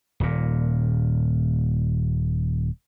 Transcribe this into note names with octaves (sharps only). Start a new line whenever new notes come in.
D#1 A#2